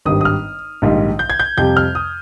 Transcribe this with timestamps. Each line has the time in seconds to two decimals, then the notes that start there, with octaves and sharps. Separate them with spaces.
0.05 G#1 G2 D#3 G3 D#6
0.21 D#6
0.25 F6
0.82 A#1 G#2 D#3 G3
1.19 G6
1.30 G#6
1.39 G6
1.57 F2 C3 G3 G6
1.77 F6
1.95 D#6